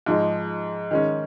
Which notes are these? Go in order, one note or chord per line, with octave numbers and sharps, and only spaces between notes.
G#2 F3 G#3
D#3 G#3 C#4